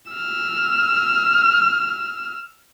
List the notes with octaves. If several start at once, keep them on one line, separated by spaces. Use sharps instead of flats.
E6 F6